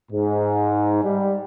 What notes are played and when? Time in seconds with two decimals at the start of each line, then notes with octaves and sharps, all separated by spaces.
0.12 G#2
1.04 G3